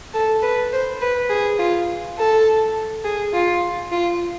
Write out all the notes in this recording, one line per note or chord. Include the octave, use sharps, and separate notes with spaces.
A4
B4
C5
B4
G#4
F4
A4
G#4
F4
F4